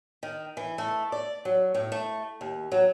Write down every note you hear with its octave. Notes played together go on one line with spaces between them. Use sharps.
D#3
E3
A3
D5
F#3
A2
A3
D#2
F#3